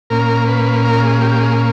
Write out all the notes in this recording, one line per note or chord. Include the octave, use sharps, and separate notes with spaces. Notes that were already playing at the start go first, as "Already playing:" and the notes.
A#2 A#3 C#4 A#4
B4
A#4
G#4
G4
G4
G#4